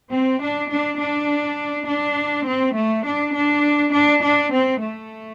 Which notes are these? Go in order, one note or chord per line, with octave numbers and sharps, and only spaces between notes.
C4
D4
D4
D4
D4
C4
A3
D4
D4
D4
D4
C4
A3